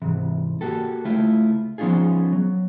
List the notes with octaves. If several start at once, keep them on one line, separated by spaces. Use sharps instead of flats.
G#2 C3 E3
A#3 F#4 G4 A4
C#2 A3 E4 F4
F3 B3 C#4 D#4 F4 G#4
F#3